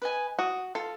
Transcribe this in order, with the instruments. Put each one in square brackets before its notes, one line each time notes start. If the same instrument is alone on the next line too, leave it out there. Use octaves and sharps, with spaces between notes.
[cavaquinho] B4 D#5 G#5
[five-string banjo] F#4 [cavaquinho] D#6
[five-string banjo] F4 [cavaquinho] A4